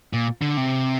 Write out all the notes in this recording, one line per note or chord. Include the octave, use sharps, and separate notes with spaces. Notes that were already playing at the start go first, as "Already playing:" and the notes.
A#2
D3
C3